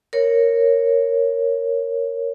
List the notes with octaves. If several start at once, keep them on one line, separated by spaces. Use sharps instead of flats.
A#4 C#5